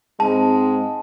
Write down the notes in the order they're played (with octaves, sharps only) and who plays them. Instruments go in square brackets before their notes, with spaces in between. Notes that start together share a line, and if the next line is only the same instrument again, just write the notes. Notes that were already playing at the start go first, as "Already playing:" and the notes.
[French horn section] G#2 G#3 C4 [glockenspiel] A5